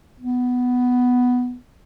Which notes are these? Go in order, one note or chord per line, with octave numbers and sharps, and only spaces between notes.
B3